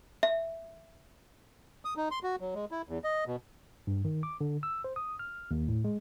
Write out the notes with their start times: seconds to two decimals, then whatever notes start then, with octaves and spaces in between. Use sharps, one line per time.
0.23 E5
1.85 D#6
1.97 D#4
2.11 C6
2.23 F#4
2.40 F#3
2.55 G#3
2.71 E4
2.89 E2
3.04 D#5
3.27 B2
3.87 G2
4.05 D#3
4.23 D6
4.41 D3
4.63 E6
4.84 C5
4.96 D#6
5.19 F6
5.51 D#2
5.68 A2
5.84 G#3